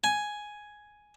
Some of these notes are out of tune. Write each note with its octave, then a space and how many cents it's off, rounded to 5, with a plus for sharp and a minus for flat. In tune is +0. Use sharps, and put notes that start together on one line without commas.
G#5 +5